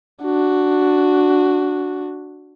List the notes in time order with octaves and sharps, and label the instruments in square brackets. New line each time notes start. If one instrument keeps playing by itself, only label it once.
[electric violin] D4 F#4